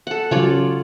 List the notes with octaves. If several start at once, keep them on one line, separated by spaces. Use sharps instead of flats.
A4 F#5
C#3 F#3 F4 C#5 D5